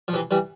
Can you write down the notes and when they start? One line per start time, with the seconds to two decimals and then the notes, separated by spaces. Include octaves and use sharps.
0.08 F3
0.13 C3 E3
0.31 E3 G3